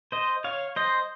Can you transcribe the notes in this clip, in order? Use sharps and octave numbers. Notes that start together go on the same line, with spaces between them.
C5 D#5
C#5 F5
C5 D#5